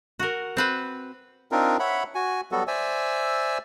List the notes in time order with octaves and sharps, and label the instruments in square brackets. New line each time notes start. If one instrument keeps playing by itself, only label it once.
[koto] F#4 A#4
C4 B4 C5
[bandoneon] C4 D4 D#4 F4 A#4
C#5 E5 F#5 B5
F#4 G#5
F#3 G3 B3 F#4 A4
C5 D5 E5 G#5 E6